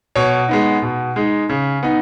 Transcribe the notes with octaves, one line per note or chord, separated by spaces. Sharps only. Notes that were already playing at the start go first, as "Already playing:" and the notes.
B2 C#5
G#3 B3 D#4
B2
G#3 D#4
C#3
B3 D#4